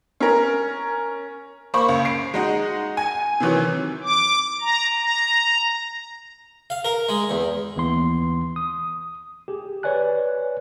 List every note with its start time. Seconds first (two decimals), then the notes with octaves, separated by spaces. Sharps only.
0.20 C#4 A#4
1.74 A#3 C5 B5 C#6
1.89 C#2
2.05 C7 D7
2.34 G#3 D#4 F#4
2.97 G#5
3.40 C3 D#3 E3 F#3
4.04 D6
4.61 A#5
5.01 A#5
6.70 F5
6.85 A#4
7.09 G#3
7.30 E2
7.76 D#2 E3 B3 C6
8.56 D#6
9.48 G4 G#4
9.83 B4 C#5 D5 G#5 F#6